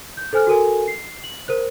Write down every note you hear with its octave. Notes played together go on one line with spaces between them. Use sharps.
G6
A4 C5 G#5 F6 F#6
F#4 A4 A#4 G#5
C7
F#7
A#4 C5 F#6